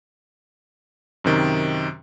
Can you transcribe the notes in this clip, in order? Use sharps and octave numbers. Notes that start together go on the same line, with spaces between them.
F#2 C3 D#3